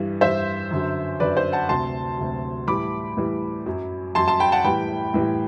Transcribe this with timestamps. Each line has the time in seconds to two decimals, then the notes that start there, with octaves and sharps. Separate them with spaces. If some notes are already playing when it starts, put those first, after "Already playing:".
Already playing: G2 E3 G3
0.21 G2 E3 G3 C5 E5
0.71 F#2 D3 F#3
1.20 F#2 D3 F#3 B4 D5
1.37 C5
1.53 F#5 A5
1.69 D2 C3 F#3 A5 C6
2.18 D2 C3 F#3
2.68 A2 E3 G3 B5 D6
3.17 A2 E3 G3
3.66 F#2 F#3
4.15 F#2 F#3 A5 C6
4.28 A5 C6
4.40 G5 B5
4.52 F#5 A5
4.64 A2 E3 G3 G5 B5
5.14 A2 E3 G3